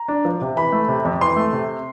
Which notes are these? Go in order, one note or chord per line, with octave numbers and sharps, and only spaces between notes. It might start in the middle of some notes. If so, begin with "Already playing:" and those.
Already playing: A#5
D4
F3
C3
E3 B5
A3
C3
F2
E3 C6
A3
C3